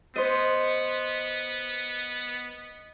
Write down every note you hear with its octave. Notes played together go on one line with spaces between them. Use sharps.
B3 C5 D#5